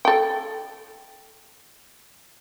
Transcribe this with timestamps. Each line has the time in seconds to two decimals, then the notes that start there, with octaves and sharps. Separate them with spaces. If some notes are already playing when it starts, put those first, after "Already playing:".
0.05 A4 G5